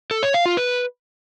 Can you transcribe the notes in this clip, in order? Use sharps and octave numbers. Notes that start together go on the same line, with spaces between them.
A4
C#5
F5
F4
B4